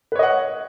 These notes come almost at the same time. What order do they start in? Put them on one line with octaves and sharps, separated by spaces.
B4 C#5 D#5 F#5